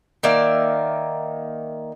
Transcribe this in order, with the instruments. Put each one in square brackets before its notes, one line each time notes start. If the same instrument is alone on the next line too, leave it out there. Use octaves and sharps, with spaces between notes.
[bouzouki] D#3 A#3 D5 E5